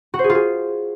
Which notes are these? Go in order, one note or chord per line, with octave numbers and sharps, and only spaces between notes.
F#4
C5
G#4
F4
G#4